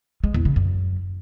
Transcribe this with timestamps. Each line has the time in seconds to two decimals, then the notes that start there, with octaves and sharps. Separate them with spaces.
0.24 G#3
0.34 E2
0.45 C#3
0.56 F#2